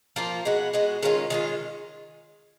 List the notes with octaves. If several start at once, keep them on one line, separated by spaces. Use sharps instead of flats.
F3 A#3 F4
G#3 B3 F#4
G#3 B3 F#4
D#3 G#3 C#4 F4
D#3 G#3 C#4 F4